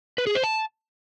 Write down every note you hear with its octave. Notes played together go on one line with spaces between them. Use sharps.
B4
G#4
C5
A5